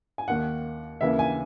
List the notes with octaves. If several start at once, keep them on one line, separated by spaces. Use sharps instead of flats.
G#5
D#2 D#3 A#3 F#5
D#2 C#3 E3 A#3 E5
G#5